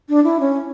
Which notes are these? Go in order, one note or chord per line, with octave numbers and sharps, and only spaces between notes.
D4
E4
C#4